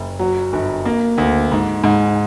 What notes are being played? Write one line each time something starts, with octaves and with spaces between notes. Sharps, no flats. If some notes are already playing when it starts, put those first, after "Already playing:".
Already playing: F#1
F#3
G1
A#3
D2
G#2
G#2